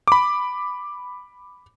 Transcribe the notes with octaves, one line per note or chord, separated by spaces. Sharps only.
B5 D6